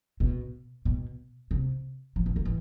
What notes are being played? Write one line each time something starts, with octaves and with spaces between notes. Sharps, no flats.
B2
B2
C3
F3
E3
D3
E3